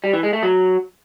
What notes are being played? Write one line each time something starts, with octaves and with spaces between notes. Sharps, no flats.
G3
E3
G#3
A3
F#3